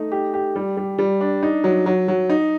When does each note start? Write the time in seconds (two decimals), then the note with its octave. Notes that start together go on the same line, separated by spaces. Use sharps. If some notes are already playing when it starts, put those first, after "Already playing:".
Already playing: A3 D#4
0.12 G4
0.34 G4
0.56 G3
0.77 G3
0.99 G3
1.21 D4
1.43 D#4
1.64 F#3
1.86 F#3
2.08 F#3
2.30 D#4